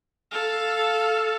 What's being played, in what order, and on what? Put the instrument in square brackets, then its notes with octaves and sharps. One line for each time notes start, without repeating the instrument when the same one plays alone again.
[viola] A4 F5